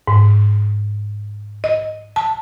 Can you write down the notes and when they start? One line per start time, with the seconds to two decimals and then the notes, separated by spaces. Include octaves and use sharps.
0.07 G#2
1.64 D#5
2.16 A5